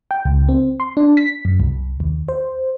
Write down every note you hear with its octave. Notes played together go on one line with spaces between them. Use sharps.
G5
C#2
C4
C6
D4
B6
F#2
C2
D#2
C5